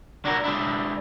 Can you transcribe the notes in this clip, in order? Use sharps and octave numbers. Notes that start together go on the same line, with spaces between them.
D4 E4 F#4 A#4
G#3 D4 E4